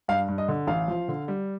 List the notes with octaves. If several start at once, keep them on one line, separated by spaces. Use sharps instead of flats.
G2 F5
G2
D#5
D3
A1 F5
F3
D3
G3